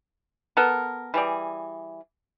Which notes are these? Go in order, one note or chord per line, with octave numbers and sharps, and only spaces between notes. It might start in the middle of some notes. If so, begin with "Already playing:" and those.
B3 A4 A#4
E3 G3 G#4 D5